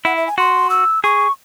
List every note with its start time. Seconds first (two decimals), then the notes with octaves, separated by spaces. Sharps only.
0.05 E4 F#5
0.17 E5
0.27 G#5
0.38 F#4 C6
0.70 E6
1.04 G#4 C#6